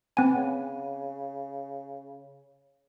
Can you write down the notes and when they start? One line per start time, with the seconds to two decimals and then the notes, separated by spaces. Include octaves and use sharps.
0.17 B3 C4 G#5
0.35 C#3